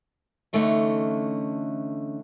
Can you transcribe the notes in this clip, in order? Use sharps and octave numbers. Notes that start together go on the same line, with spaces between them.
D3 E3 A3 C#4 D#4